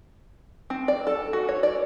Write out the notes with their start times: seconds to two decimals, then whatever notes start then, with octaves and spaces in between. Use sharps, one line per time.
0.70 C4
0.88 D5
1.07 A4
1.33 F#4
1.49 C#5
1.63 D5